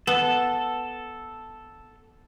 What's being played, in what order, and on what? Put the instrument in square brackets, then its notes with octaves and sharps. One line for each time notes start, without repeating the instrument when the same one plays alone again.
[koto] B3 [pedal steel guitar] A4